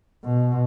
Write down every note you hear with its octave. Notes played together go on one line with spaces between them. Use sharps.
B2